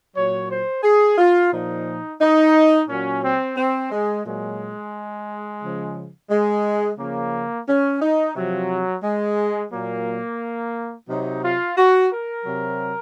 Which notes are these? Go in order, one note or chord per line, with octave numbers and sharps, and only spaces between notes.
A#2 F#3 C#5
C5
G#4
F4
A#2 F3 D#4
D#4
A#2 F#3 C#4
C4
C4
G#3
A#2 F#3 G#3
C#3 F3
G#3
C#3 F3 A#3
C#4
D#4
C3 F3 F#3
G#3
A#2 F#3 A#3
C3 F#3 D#4
F4
F#4
A#4
C3 F#3